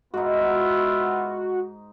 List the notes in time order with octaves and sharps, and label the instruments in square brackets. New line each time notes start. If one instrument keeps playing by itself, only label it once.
[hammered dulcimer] G#2 D#4 [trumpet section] B3 F4 E5 [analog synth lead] F#4